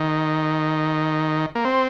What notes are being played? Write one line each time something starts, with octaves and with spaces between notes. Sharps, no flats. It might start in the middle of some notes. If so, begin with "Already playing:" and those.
Already playing: D#3
A#3
C4